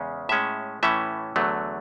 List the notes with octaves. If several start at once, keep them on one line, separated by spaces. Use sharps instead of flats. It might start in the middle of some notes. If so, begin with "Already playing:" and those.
Already playing: E2 C#3 G#3 C#4
A2 G#3 C#4 E5
A2 E3 A3 C#4 E5
E2 D3 F#3 A3